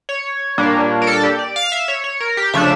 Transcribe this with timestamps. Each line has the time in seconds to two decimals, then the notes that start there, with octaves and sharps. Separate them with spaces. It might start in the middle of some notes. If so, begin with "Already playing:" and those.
0.09 C#5
0.58 A#2 G3 A#3 D4
1.02 A#4
1.07 A4
1.23 G4
1.39 D5
1.56 F5
1.72 E5
1.88 C#5
2.04 C#5
2.20 A#4
2.37 G4
2.53 C#3 F3 A3 D4 E5